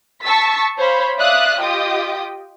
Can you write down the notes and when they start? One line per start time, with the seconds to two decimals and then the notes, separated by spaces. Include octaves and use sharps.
0.23 A5 C#6 E6 A6 B6
0.78 C5 C#5 F5 B5
1.17 D5 E5 F5 D#6 F#6
1.60 F4 G4 D#5 G5 D#6